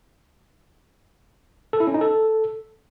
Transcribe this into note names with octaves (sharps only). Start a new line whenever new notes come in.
A4
E4
C#4
D#4
A4